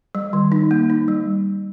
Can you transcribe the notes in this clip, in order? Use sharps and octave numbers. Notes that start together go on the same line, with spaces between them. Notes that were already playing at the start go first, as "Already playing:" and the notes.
G3
D#3
D#4
A#3
D#4
G3